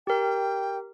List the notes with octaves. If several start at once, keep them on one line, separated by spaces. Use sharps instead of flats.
G4 A#4 G5